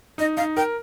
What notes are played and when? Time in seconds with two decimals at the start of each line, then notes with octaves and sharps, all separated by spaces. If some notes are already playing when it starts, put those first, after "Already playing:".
0.18 D#4 D#5
0.37 D#4 F5
0.57 A#4 G5